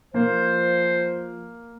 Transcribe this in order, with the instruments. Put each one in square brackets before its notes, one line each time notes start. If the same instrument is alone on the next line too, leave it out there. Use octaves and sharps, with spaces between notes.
[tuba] F3 [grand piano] A#3 [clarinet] C5